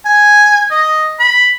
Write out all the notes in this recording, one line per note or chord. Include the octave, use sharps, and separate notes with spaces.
G#5
D#5
B5